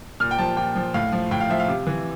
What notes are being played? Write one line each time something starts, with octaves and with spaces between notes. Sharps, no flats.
A#2 F6
G5
F3 A5
A#2 G5
F3
A2 F5
F3
A2 G5
F5
F3 E5
F5
C3
E3